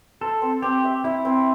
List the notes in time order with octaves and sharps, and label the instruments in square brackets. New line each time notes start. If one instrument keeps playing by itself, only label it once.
[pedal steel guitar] A4 [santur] C5
[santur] C4
[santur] C4 [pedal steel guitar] G4
[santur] E5
[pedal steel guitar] E4 [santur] E5
[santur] C4